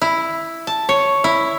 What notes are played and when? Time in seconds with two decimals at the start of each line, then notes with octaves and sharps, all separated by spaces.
0.02 E4
0.67 A5
0.89 C#5
1.24 E4